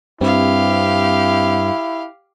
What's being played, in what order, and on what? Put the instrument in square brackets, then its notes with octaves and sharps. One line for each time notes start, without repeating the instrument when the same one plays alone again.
[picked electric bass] G2 [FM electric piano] C4 [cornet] E4 [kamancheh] G4 F5